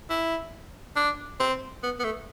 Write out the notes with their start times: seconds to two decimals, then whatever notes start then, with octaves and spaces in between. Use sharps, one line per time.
0.10 E4
0.96 D4
1.40 C4
1.83 B3
2.00 B3
2.04 A3